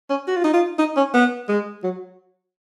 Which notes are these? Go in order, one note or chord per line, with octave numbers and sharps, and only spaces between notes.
C#4
F#4
F4
D#4
F4
D#4
C#4
B3
G#3
F#3